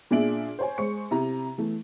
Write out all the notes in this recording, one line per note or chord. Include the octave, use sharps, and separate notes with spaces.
A#2 D4 G#4 E5 D7 F#7
C5 C#5 G#5
G#3 C5 C#6 C#7
C3 E4 A#5
E3 A3